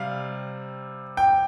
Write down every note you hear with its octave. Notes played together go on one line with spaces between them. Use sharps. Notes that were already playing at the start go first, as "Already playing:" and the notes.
Already playing: C3 G3 F5
G5